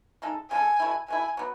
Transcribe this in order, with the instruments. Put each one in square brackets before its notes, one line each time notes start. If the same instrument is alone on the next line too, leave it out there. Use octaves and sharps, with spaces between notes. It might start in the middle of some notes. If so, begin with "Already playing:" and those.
[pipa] C#3 G#3 D#4 A4
[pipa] C#3 G#3 D#4 A4 [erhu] G#5
[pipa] B2 A3 E4
[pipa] B2 A3 E4 [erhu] G#5
[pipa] F#3 B3